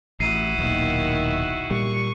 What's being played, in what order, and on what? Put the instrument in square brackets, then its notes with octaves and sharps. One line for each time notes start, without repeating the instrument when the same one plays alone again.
[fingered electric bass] A1 [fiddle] E4 F#4 [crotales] C7 D#7
[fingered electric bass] D#1 B1 [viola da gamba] D#3 A#3
[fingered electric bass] A#2 G3 [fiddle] C#6